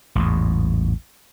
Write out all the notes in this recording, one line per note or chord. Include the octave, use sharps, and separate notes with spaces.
A1 E2 G#2